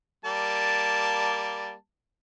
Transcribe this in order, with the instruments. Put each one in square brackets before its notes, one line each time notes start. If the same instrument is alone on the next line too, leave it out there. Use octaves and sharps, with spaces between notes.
[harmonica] G3 A#3 A5